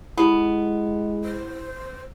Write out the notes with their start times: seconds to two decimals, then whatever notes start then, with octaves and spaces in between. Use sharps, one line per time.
0.18 G#3 B3 E4 G4
1.24 C5